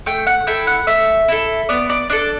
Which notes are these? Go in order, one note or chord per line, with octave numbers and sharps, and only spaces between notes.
A3 G5
F#5
E4 A4 G5
F#5
A3 E5
E4 A4
B3 D5
D5
D4 A4 D5